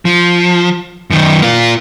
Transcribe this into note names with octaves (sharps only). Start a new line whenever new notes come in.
F3
F#2 D#3
A#3 F4